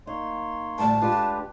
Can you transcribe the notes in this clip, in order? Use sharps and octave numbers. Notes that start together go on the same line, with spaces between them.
A#3 D#4 C#5 C6
D2 A2 G3 A5
G#3 D4 F4 G4 B4